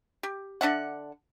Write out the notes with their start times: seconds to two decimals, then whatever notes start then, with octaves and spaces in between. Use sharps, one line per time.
0.23 G4
0.61 D3 D4 E5 F#5